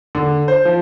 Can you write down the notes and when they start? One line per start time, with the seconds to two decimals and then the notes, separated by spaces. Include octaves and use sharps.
0.15 D3
0.48 C5
0.65 F3